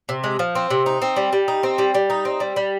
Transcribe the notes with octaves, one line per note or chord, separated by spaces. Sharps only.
C3
G#3
F3
C4
C3
D#4
C4
G3
G3
D#4
C4
G3
G3
D#4
C4
G3
G3